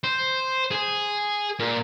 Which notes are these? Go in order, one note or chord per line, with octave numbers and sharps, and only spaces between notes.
C5
G#4
A#2